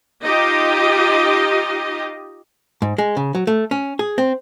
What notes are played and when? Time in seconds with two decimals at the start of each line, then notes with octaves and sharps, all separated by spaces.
0.23 D#4 F4 G4 D#5
2.82 G#2
2.98 G#3
3.17 C#3
3.35 F#3
3.47 A3
3.71 C#4
3.99 G#4
4.18 C4